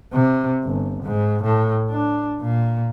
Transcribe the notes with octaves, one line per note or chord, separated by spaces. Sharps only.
C3
G1
G#2
A2
D4
A#2